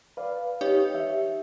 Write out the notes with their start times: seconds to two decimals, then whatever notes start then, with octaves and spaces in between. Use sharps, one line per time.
0.17 B4 D5 F5
0.61 D#4 G4 C#5
0.95 E5